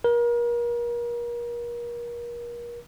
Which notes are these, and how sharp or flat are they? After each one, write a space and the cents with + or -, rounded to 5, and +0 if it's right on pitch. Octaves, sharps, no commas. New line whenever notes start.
A#4 +35